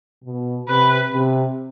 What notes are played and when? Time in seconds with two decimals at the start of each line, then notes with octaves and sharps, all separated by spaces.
0.24 B2
0.68 C3 B4
1.12 C3